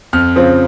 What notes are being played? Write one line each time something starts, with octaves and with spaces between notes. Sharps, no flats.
F2 F6
C#3 F3 C4